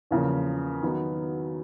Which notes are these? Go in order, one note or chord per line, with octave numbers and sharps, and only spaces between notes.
E2 C#3 F3 A#3
D#3 F#3 B3